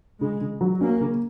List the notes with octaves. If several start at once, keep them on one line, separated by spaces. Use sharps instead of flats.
C#3 G#3
C#3
F#3
A#3 C#4
C#3